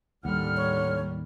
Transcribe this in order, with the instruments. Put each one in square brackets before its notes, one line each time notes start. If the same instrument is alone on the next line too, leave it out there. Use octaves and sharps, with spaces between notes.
[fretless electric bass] D#2 [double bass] A2 G3 [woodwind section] D3 F#5 F6
[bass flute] C#5